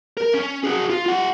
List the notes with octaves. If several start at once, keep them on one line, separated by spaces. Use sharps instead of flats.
A#4
C#4
F#4 G#4
F4
F4 F#5